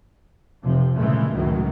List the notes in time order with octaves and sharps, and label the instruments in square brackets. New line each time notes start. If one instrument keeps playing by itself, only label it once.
[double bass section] F1 C3 F3
A#2 C#3 E3 G#3 A3
C#2 F#2 A2 D#3 F#3